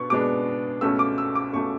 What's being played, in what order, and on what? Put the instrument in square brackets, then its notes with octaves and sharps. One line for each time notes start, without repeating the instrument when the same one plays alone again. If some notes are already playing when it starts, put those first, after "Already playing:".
Already playing: [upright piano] B2 B3 D4 C#6
B2 G#3 B3 D4 D6
C#2 B2 A3 C#4 E6
D6
E6
D6
C#2 B2 A3 C#4 C#6